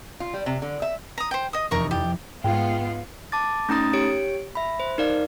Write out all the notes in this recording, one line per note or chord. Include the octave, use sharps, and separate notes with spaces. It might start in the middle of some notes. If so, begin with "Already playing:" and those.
F4
G3
C3
D3
E5
A#5 D#6
C5 G5
D#5 D#6
F1 E2 A#4 A#5 C#6 D#6
F2 E4 G4 A6
G#2 G#3 B3 F4 G5
A5 D6 A6
A3 C#4 D#4 A#5 D#6 A6
G4 C#5 D7
E5 B5
C5
D#4 A#4 D5 F5